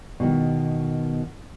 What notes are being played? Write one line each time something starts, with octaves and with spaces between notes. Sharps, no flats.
B2 D#3